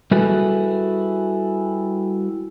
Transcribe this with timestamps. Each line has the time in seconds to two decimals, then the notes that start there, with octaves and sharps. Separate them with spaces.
0.11 G3 E4 F#4 G#4 A4 B4